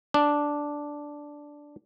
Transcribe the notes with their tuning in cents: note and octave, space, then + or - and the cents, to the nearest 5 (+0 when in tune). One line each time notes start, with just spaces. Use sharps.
D4 -5